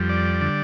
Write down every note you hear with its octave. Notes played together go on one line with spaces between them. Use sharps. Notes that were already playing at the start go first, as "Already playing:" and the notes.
Already playing: F2 G3
D5
D3